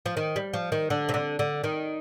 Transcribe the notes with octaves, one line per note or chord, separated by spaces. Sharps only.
F3
D#3
G3
F3
D#3
D3
C3
D3
D3
D#3